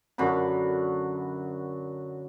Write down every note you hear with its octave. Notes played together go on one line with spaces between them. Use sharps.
F#2 D3 B5